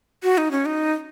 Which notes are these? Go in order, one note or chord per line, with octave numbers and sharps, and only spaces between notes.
F#4
D#4
C#4
D#4